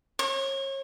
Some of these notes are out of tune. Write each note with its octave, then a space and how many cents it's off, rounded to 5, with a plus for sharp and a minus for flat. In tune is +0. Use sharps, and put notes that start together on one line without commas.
C#5 -35